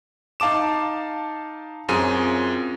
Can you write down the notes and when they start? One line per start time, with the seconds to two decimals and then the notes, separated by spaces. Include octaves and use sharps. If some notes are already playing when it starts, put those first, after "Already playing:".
0.40 D#4 F5 A5 D6 E7
1.89 F#2 C4 F4 G#4 D#7